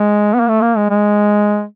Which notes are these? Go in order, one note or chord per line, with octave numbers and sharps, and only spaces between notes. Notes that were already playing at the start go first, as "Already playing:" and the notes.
Already playing: G#3
B3
A#3
A3
A#3
G#3
G#3